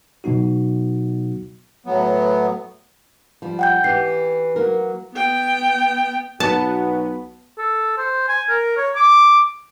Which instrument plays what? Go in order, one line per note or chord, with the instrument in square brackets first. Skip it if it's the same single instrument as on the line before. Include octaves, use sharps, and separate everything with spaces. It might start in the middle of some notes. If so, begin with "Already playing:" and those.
[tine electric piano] B2 F#3 B3 D#4 F#4
[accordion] A2 F#3 B3
[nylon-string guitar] F3 G3
[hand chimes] F#5 G5 G6
[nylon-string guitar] E3 G4 [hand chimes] C7
[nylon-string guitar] F#3 A#3 A#4
[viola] B3 G5
[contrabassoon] B1 [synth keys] B3 [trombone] F#4 [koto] A5
[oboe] A4
C5
G#5
A#4
C#5
D6